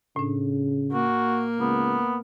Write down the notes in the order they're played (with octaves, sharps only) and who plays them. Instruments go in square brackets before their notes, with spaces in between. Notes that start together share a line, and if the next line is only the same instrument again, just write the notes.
[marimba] A2 D4 [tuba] C#3
[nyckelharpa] A#3 [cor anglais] F#4
[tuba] C#2 [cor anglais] B3